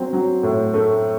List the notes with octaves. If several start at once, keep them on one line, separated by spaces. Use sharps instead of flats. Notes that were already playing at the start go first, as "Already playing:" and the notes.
Already playing: F#3 C4
F#3
A2
A3